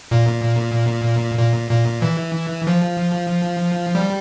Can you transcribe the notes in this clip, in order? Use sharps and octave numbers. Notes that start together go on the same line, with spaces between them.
A#2
A#2
A#2
E3
F3
G3